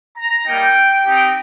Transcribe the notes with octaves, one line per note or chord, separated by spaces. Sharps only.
A#5
G3 A#3 D#4 G5
C4 D#4 G4